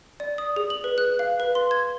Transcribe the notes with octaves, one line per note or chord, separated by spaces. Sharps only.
D5
D#6
G#4
F#7
B4
F#6
F5
B4
C6
G#6